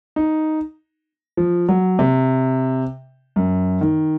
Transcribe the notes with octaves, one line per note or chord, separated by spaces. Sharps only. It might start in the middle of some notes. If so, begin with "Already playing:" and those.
D#4
F3
F#3
C3
F#2
D#3